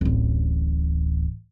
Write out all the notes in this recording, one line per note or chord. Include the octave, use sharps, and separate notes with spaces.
D1 A1